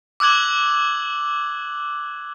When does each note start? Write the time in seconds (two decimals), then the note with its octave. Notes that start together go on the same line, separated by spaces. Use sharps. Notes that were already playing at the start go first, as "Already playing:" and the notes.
0.20 D6 E6 F#6 G#6 F#7